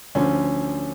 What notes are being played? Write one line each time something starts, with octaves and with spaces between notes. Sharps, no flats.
D2 D3 F3 C#4